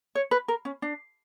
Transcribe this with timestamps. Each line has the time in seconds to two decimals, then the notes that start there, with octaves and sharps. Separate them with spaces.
0.15 C#5
0.31 B4
0.48 A#4
0.65 C#4
0.82 D4